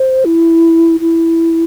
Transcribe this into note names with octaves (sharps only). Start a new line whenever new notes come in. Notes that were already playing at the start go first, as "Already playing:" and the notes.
Already playing: C5
E4
E4